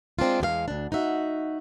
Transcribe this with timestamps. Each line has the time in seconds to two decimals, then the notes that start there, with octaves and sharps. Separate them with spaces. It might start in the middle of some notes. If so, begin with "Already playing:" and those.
0.19 G#3 C4 D4 F4
0.40 E2 G#3 G4 F5
0.68 D2 D4
0.92 D#4 F#4 E5